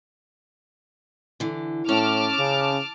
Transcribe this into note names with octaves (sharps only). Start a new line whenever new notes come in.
D3 E3
A2 C#4 A5 D6 F6
C#3